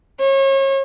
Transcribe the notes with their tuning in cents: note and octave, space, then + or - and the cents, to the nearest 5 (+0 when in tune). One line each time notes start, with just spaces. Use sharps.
C#5 -35